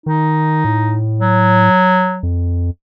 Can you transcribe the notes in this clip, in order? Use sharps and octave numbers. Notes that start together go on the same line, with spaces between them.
D#3 D#4
A2
F#3
F2